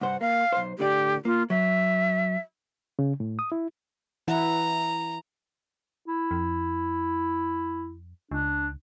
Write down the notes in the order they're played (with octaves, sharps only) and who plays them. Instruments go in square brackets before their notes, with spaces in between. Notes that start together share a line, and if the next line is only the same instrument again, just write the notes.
[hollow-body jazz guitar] C2 G2 C5 [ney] F#5
[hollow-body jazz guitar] A#3 [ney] F5
[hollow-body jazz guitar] B1 C5
[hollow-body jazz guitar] A2 D3 D5 [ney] G4
[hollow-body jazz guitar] A#3 [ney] F4
[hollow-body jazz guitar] F#3 [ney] E5
[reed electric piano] C#3
A2
D#6
E4
[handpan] E3 E4 F#5 [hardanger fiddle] A#5
[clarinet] E4
[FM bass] F2
[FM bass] C#2 [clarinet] D4